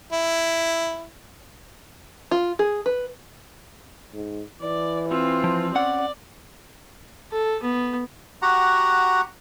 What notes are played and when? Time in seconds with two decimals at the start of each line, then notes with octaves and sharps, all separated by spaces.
0.12 E4
2.31 F4
2.59 G#4
2.86 B4
4.13 G#2
4.61 E3 D5
5.09 C4 F4
5.44 F3
5.75 C#4 D5 F#5
7.32 A4
7.62 B3
8.42 F#4 G4 F#5 A#5